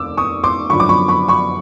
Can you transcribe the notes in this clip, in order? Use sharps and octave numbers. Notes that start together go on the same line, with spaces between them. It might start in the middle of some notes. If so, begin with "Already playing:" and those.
Already playing: F1 D#2 D6 E6
C#6 D#6
C6 D6
F#2 D3 F3 B5 C#6
D6
B5 C#6
B5 C#6
B5 C#6